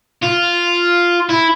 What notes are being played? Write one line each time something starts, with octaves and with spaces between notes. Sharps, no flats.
F4
E4